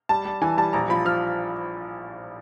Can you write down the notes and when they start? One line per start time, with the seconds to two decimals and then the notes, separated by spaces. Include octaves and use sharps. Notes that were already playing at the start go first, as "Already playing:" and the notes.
0.09 G3 A5
0.25 G3
0.42 E3 G#5
0.57 G3 A5
0.73 A#1 A#5
0.89 F3 B5
1.05 F3 F6